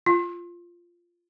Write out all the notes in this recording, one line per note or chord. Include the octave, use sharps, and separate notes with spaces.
F4